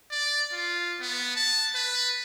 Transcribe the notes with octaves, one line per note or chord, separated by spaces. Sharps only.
D5
F4
B3
A5
B4